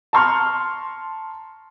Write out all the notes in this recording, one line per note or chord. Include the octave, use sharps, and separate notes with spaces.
A5 A#5 C6 C#6 F6